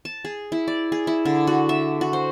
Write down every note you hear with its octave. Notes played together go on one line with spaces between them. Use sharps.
A5
G#4
E4
D5
G#4
E4
D3
F#4
E5
F#4
C5